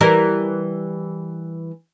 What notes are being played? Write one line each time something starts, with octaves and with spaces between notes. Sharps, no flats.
E3 G3 A#4